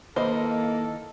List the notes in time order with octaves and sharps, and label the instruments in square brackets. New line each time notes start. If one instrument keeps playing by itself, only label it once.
[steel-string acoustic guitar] D#3 D#5 [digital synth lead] A#3 [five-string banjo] E4 B4 C5 [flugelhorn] A4